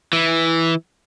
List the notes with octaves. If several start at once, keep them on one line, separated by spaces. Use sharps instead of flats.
E3